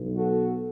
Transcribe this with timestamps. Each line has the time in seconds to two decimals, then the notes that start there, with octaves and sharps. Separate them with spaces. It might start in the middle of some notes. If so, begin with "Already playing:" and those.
Already playing: B1 B2
0.15 F#4 A4